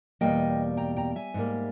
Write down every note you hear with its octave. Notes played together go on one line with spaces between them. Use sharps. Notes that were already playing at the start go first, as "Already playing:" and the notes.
E2 B2 G3 A#3 D#5 G5
G5 A#5
G5 A#5
E5 G#5
G#2 G3 A#3